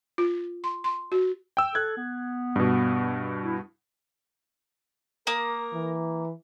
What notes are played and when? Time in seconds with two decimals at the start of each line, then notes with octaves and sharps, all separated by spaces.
0.18 F4
0.64 C6
0.84 C6
1.12 F#4
1.57 G5 E6
1.75 A4 F#6 G#6
1.97 B3
2.56 G2 B2
3.44 E4
5.27 A#3 A#4 D#6
5.74 E3